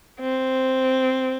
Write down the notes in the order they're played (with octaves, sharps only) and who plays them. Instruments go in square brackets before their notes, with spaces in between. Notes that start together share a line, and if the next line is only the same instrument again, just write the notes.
[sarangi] C4